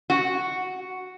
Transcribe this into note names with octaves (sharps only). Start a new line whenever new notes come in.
F#4